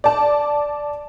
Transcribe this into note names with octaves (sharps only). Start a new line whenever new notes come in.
D5 A5